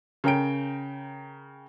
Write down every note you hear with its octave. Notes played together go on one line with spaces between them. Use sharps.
C#3 A#4 G5 D7